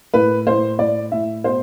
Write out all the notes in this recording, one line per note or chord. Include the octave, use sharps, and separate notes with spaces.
A2 B4
A2 C5
A2 D5
A2 E5
B2 C5